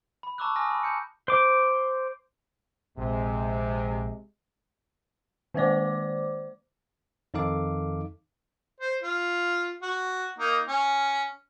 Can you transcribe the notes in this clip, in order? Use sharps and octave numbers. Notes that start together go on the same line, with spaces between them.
B5
A5 A#5 C#6 D6 E6 F#6
G#5 A5 D#6 F6 A#6
B5
A5 G6 C#7
C5 D6
A#1 C3 G#3
D#3 G#3 A#3 C5 D5 D6
F2 D#3 D#4 A4 F5 D6
C5
F4
F#4
A#3 D#4
C#4